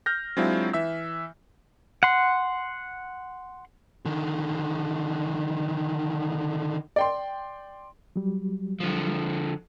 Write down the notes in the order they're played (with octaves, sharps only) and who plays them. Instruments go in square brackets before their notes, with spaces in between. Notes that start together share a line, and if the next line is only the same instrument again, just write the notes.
[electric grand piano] F6 G6 A#6
F#3 G#3 C4 D4 E4 F4
E3 E5 E6
[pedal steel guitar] F#5 C6
[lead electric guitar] D3 D#3
[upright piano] D5 G5 C6
[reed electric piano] F#3 G3
[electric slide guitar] D3 F3